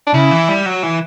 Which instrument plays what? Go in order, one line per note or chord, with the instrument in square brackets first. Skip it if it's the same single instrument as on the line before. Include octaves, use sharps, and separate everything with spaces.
[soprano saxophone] D4
[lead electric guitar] C#3 [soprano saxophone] E4
[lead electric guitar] E3
G3
F#3
E3